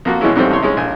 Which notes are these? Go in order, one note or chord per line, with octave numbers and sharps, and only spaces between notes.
F2 A#3 F#4
B2 E3 G#3 C#4 E4
F2 G#2 G3 A3 C4
C#2 A2 C#5 C6
G#3 C#4 D#4
A#1 G#5